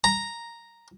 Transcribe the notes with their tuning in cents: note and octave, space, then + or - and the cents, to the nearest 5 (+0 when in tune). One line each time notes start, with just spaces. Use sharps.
A#5 +0